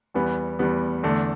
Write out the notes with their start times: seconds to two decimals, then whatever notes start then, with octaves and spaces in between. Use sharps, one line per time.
0.14 E2 E3 G3 B3
0.59 E2 E3 G3 B3
1.03 E2 D3 A3